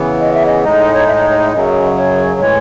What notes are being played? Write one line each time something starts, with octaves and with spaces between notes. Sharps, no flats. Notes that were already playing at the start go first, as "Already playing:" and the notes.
Already playing: C#3 E3 B3
D#5
E5
D#5
A2 G#3 D#4 D#5
C#5
E5
D#5
C#5
E5
F#2 C#3 F#3 D#5
C#5
A2 E3 G#3 C#5